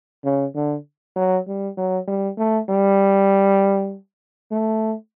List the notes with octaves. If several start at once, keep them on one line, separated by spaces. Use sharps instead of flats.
C#3
D3
F#3
G3
F#3
G3
A3
G3
A3